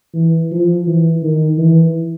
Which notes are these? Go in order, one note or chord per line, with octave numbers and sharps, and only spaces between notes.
E3
F3
E3
D#3
E3